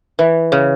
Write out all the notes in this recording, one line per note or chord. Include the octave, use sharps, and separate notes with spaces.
E3
C#3